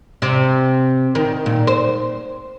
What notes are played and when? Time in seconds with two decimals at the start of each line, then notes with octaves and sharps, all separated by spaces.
0.22 C3
1.15 D#3
1.46 A#2
1.67 C5